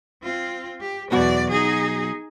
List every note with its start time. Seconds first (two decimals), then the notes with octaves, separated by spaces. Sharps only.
0.23 C4 F4
0.80 G4
1.11 B1 E2 B2 F#4 D5
1.51 D#4 G#4